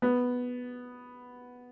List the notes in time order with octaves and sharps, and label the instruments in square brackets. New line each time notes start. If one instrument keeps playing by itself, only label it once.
[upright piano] B3